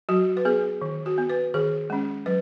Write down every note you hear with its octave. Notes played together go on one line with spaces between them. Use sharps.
F#3 F#4
B4
B3 G#4
D#3
F#4
B3
B4
D#3 G#4
G#3 C#4
F#3 B4